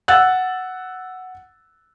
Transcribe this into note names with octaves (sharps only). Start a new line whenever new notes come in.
F#5 E6 F#6 A6